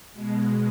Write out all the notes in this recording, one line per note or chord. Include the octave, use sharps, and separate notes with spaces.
B2 G#3